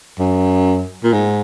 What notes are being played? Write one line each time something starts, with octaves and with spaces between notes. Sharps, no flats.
F#2
A#2
G#2